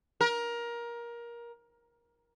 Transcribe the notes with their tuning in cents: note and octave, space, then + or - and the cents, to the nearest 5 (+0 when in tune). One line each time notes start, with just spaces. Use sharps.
A#4 +20